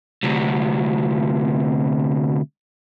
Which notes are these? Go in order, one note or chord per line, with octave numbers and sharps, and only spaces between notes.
D2 C3